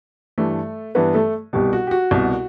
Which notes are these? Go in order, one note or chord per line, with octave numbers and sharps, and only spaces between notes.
G2 E3 A3 A4
G2 E3 B3 B4
A3 A4
C2 B2 G3 G4
F#4
G4
F#4
C2 B2